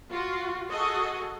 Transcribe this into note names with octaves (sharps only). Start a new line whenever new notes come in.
F4 F#4
F#4 G#4 A4 D#5